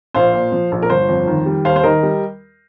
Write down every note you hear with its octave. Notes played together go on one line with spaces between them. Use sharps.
A#1 C5 F5
A#2
F3
A#1
A#4
G1 C5
F2
D#3
G3
D#2 C5 F5
C5
D#3 A#4 D#5
G3